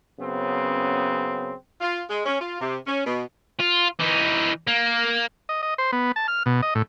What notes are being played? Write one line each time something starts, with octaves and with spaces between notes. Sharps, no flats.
F#2 C#3 B3 C4
F4
G#3
C#4
F4
C3
C#4
B2
F4
E3 D#4
A#3
D#5
D#5
C5
B3
A5
F6
B2
D#5
A2